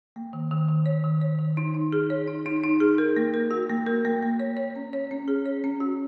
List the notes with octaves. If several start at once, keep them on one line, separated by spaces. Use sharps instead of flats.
A#3
D#3
D#3
D#3
C#5
D#3
C#5
D#3
D#4
D#4
G#4
C#5
D#4
D#4
D#4
G#4
A#4
A#3
A#4
F#4
A#3
A#4
A#3
A#3
C#5
C#5
C#4
C#5
C#4
G#4
C#5
C#4
F#4